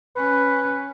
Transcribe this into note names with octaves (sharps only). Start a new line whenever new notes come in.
C#4 B4